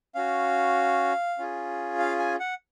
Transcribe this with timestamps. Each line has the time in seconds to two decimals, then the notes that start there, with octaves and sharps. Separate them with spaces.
0.15 C#4 F#4 F5
1.38 C#4 F4 G#4
1.99 F5
2.19 G#5
2.40 F#5